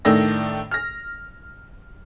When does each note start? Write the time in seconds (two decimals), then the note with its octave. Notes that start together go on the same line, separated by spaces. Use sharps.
0.05 A2 D#3 A3 D4 E6 A#6
0.71 F6 A#6